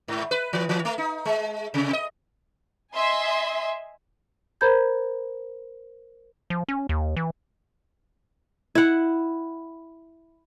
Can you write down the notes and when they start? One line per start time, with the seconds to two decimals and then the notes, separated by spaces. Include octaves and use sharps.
0.08 G#2
0.31 B4
0.53 E3
0.69 E3
0.85 A3
0.98 D#4
1.25 G#3
1.74 C3
1.93 D#5
2.94 D#5 E5 G#5 C6
4.61 A#4 C5 A#5 B5 G6 G#6
6.50 F3
6.68 C#4
6.89 D#2
7.17 E3
8.75 E4 F#5